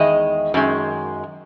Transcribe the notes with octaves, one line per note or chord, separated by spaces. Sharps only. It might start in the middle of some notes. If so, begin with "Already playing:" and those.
Already playing: E2 D#3 G#3 D#5
F#2 D#3 G#3